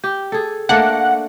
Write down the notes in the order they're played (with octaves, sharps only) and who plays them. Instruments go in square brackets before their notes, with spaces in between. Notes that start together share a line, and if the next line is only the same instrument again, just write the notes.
[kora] G4
G#4 A4
[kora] A3 A#3 D4 [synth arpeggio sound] F#5